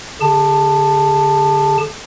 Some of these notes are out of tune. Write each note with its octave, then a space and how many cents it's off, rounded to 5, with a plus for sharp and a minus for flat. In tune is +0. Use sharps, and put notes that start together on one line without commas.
D3 -20 G4 +45 A5 +5